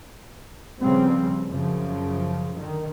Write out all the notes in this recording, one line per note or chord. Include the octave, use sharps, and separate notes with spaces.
C#3 F3 G3 B3 C4
F#2 C#3 F3
D3 D#3